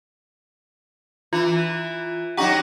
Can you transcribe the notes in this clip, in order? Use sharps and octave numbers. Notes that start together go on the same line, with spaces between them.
E3 F4
F#3 D#4 G4 F#5 A#5 C#6